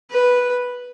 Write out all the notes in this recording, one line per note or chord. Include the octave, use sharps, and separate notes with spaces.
B4